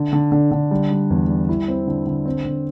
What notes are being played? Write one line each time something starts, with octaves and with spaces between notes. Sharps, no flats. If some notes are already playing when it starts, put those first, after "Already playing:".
Already playing: D3
D3
D3
D3
G3
G3
E2
G3
E4
C4
D3
D3
C4
D3